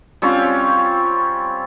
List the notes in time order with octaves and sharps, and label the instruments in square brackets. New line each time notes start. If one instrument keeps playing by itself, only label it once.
[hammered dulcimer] G3 C4 C#4 F4